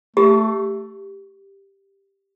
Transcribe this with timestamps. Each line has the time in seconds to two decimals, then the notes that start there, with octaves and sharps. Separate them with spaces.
0.16 A3 G4